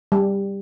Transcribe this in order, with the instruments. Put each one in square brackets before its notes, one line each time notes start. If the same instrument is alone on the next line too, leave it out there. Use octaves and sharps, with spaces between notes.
[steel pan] G3